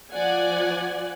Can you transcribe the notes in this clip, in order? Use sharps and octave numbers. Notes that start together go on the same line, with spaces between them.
F3 D5 F#5 G#5